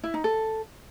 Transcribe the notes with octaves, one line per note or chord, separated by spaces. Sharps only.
E4
D#4
A4